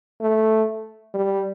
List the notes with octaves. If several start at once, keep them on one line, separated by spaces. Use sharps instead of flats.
A3
G3